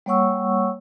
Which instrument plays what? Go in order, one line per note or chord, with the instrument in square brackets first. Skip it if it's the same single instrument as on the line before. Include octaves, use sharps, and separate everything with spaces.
[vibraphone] G3 A#3 C#5 F#5 C#6 E6